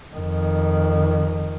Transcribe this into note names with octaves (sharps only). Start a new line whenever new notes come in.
F2 D#3